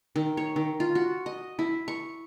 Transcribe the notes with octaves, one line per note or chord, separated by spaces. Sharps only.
D#3
C#5
D#3
F4
F#4
D#5
E4
C#6